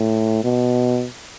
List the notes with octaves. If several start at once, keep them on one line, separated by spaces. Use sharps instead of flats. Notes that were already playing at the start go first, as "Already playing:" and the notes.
Already playing: A2
B2